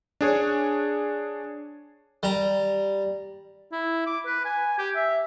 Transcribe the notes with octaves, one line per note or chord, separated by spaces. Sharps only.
D4 G#4 C#5
G3 A#5
E4
D6
B4
G#5
G4
E5